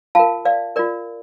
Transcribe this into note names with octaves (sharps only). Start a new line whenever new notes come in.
F4 A#4 F5 A5
D5 F5
F4 A#4 D5